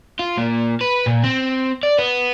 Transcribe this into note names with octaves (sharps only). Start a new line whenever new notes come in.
F4
A#2
B4
A#2
C4
D5
B3